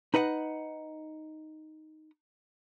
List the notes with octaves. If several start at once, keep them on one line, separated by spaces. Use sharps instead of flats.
D#4 B4 D#5 F#5